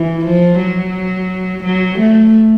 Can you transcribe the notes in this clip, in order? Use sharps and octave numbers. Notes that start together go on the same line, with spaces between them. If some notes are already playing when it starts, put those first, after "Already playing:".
Already playing: E3
F3
F#3
F#3
A3